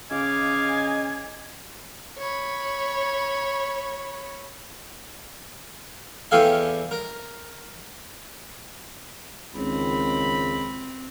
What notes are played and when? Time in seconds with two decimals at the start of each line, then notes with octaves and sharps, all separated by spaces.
0.11 C#3 D#5 F5 G#5 D6
2.18 C#5 B5
6.31 E2 G4 A4 F5 G#5
6.91 A#4
9.56 C#2 D#3 C4 B5